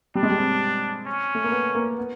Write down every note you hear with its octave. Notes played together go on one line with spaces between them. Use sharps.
G3 D4
G#3
G3
C4
C#4
A3
A#3
B3
A#3
B3